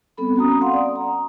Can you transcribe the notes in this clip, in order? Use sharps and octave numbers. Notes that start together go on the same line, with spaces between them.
G3 B3 C4 A4 B5
C#4 F#4 A#5 D#6
F5 F#5 C6
D5 D#6
A#5